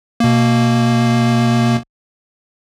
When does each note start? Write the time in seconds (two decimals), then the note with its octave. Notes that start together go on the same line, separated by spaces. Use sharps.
0.20 B2 A#3